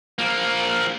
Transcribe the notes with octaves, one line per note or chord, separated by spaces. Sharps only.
F3 A#3